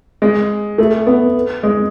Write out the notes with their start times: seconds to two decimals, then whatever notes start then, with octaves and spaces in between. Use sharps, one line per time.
0.22 G#3
0.78 A3
1.07 B3
1.63 G#3